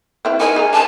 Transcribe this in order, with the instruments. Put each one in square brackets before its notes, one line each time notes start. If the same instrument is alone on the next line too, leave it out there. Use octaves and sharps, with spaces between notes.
[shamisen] C4 E4 B4
[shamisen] D#4 A#4 [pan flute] G#5
[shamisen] G#4 D5 A#5
[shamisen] D4 B4 C5 [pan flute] A5